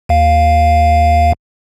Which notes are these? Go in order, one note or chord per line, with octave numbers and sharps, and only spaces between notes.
D#2 F5